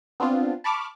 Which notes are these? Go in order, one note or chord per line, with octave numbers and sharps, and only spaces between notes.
B3 C4 D4 F4
A5 B5 C#6 D6 F6 B6